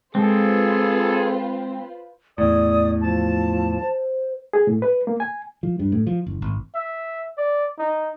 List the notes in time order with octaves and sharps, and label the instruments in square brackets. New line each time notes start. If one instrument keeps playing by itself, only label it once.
[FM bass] G#3 [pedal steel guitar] C4 [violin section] F4 B4 C5 [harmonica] G#4 A4
[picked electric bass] E2 A2 [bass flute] D5 [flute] D#6
[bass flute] F3 [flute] A5
[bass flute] C5
[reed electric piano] G#4
A2
B4
A#3
G#5
[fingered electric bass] F3
G2
A2
F3
F#1
G#1
[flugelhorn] E5
D5
D#4